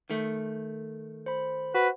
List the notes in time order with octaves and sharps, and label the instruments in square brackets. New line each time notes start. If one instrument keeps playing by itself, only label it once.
[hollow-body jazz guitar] D#3 A3
[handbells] C5 B5
[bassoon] F#4 [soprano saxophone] B4